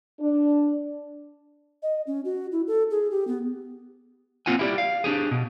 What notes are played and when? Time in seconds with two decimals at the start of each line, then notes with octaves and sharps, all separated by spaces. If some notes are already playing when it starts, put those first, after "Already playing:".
0.20 D4
1.83 D#5
2.07 C#4
2.25 F#4
2.52 E4
2.67 A4
2.91 G#4
3.11 G4
3.28 B3
4.46 A#3 C4 E4 F4 F#5 G#5
4.59 E4 G4 D5
4.78 F5
5.04 D4 D#4 G4 G#4
5.31 B2